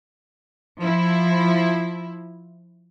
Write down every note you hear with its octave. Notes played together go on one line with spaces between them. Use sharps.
F3 E4